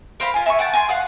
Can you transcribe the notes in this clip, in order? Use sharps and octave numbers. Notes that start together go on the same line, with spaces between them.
A#4 C5 F5 B5
F4 G#5
E5 G#5 B5 C#6
F#5 G5 A5
G#5 A#5 C6
F5 F#5 D#6